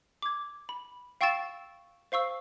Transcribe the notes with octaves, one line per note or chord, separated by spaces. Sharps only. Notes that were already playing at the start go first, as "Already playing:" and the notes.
D6 G#6
B5
F5 G5 C#6 E6 A6 E7
C5 F5 C#6 E6